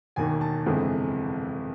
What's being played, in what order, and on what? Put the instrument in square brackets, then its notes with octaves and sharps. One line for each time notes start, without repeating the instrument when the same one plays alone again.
[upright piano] E1 D#2 D#3 G#5
A5
G1 F2 C3 E3 G#3